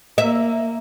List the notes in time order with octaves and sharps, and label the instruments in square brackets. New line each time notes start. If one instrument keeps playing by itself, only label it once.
[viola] A#3 [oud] E5